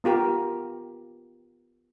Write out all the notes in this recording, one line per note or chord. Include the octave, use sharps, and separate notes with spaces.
B3 F4 G4 A#4